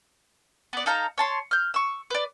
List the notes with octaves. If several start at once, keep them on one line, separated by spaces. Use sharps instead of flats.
B3 D5
D#4 A4 F5 A#5
C#5 A5 C6
F6 G6
C#6 E6
B4 D5